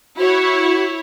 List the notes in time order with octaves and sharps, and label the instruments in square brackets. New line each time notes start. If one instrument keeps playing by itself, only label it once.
[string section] E4 C#5 [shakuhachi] F#4